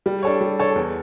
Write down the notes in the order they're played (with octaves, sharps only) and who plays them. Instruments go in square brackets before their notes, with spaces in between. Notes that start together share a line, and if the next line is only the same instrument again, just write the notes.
[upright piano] G3
D4 A4 C#5
G3
D4 A4 C#5
E2